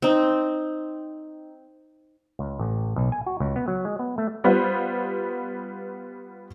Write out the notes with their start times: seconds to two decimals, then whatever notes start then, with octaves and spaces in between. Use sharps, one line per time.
0.02 C4 D#4
2.39 C#2
2.59 A1
2.96 B1
3.12 G#5
3.26 F#4
3.40 C#2
3.56 B3
3.68 F#3
3.85 G#3
3.99 B3
4.18 A3
4.44 G3 B3 F4 B4 C5